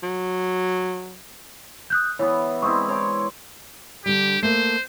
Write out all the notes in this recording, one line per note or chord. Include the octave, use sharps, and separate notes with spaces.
F#3
D#6 F#6 G6
E3 B3 C#5
G#3 C4 E4 C#6 D#6
C#5 C6 D6
D3 G3 G4
A3 A#3 C5